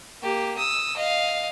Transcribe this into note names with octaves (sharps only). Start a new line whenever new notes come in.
A#3 G4
D#6 E6
D#5 F5